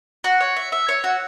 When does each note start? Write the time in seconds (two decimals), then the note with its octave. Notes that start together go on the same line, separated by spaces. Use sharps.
0.24 F#4
0.40 C#5
0.56 E5
0.72 E5
0.88 C#5
1.04 F#4